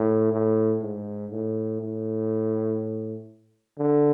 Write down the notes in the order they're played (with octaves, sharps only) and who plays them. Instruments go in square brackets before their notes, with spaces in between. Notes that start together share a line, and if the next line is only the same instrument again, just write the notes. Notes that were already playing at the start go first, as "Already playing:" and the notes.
Already playing: [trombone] A2
A2
G#2
A2
A2
D3